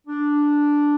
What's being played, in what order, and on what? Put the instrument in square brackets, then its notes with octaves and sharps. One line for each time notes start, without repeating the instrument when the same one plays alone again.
[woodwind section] D4